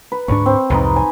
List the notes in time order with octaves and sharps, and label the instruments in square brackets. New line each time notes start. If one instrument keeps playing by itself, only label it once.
[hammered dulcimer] B4
[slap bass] D2 G#2 D4 [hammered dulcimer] C#6
[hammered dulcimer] C4
[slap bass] C2 F2 G#2 [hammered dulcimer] D#4 B4 C6
[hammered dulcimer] G#5